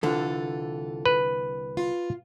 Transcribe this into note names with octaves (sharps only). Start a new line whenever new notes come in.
C2 D3 E3 F4 A4
B4
F4